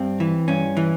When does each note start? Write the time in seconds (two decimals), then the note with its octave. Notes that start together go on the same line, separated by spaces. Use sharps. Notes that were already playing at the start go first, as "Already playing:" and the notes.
Already playing: G2 C4
0.20 E3
0.48 G2 C#4
0.77 E3